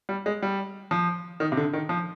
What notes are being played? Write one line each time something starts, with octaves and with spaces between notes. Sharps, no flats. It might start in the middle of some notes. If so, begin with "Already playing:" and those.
G3
G#3
G3
F3
D#3
C3
D3
D#3
F3